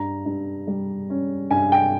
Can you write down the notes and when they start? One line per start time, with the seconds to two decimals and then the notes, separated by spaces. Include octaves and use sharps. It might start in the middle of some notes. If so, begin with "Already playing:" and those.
Already playing: G2 A#5
0.26 G2
0.67 G3
1.10 C#4
1.51 G2 G#5
1.72 G5